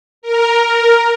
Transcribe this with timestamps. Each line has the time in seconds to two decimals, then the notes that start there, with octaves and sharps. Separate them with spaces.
0.22 A#4
0.59 A#4